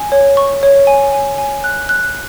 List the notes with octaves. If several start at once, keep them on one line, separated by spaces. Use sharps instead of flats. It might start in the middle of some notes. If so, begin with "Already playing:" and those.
Already playing: G#5
C#5
C#6
C#5
G#5
G#5
G#5
F#6
F#6